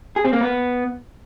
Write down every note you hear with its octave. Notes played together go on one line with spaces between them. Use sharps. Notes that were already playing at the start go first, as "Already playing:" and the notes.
G#4
C4
A#3
B3